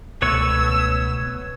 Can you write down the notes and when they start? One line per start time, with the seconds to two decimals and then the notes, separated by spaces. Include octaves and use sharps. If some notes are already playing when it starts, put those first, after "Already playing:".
0.22 C#2 B2 A3 B4 C#5 C#6 E6